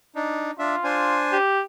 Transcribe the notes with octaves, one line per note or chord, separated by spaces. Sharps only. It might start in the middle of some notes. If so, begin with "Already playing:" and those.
D4 D#4
D4 F4 E5
D4 C5 G#5
G4